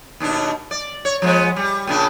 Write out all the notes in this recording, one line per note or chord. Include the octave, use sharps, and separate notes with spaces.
D#2 B2 D4
D5
C#5
F3 G#3 B3
G3
A#2 C#3 D4